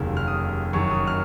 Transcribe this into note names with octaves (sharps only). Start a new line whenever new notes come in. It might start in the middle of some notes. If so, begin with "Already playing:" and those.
Already playing: F1 D#2 C#3 F#3
F6
D#6
F#1 F#2 D#3 F#3 C#6
D#6
F6